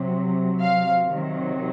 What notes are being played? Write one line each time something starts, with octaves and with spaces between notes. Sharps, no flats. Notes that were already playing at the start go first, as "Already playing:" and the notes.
Already playing: C3 F#3
F5
C3 D#3 F#3